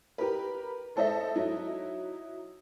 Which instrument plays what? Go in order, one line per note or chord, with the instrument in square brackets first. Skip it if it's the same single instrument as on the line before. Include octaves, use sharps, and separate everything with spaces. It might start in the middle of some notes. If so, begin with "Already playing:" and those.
[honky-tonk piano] G4 A#4 B4
G#3 A4 C5 D#5 E5
F#3 D#4 E4